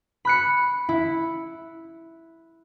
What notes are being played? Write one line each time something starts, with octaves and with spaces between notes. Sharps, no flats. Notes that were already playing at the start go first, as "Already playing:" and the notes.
B5 F#6 C#7
E4